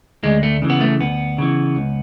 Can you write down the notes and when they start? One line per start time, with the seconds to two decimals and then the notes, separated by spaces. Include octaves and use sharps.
0.24 D2 G#3
0.43 A3
0.62 C#3 E3
0.70 B3
0.81 A3
1.01 D2 B3
1.38 C#3 E3
1.76 C#2